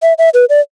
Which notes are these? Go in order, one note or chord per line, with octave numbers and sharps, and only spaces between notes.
E5
E5
B4
D5